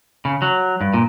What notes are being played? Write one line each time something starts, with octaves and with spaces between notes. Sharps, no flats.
C#3
F#3
G2
A#2